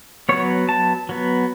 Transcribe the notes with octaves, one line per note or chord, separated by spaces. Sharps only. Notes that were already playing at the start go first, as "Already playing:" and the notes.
F#3 B3 C#5
A5
F#3 B3